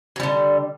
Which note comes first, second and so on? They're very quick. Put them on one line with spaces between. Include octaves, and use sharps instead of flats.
F#3 G3 D3